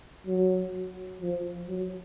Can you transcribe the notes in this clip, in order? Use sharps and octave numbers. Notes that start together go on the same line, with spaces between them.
F#3
F3
F#3